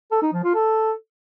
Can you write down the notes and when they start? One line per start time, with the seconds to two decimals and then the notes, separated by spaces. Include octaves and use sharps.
0.11 A4
0.22 D#4
0.33 F3
0.44 F4
0.55 A4